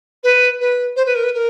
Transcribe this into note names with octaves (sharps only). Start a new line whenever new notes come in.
B4
B4
C5
B4
A#4
B4
A#4